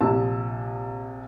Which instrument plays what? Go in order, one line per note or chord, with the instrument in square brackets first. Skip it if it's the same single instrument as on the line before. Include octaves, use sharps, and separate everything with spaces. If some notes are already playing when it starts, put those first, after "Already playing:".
[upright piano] A#1 C3 A5 E6